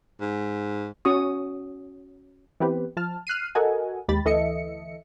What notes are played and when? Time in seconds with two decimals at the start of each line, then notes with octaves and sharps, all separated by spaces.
0.21 G#2
1.05 C#4 F#4 C#6 D#6
2.60 E3 B3 C4 G4 B4
2.97 F3 A5 F6
3.27 F6 F#6 C7 D#7
3.55 F#4 A4 A#4 D#5 F#5 G#5
4.08 D#2 G#3 G4 B5 A6
4.25 D2 E3 A4 D#5 E5 C#7